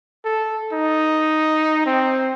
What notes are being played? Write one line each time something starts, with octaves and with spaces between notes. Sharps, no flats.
A4
D#4
C4